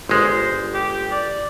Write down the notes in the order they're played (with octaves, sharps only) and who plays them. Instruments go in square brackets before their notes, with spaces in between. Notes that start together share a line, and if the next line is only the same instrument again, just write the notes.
[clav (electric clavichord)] G1 G#3 [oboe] C5
[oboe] G4
D5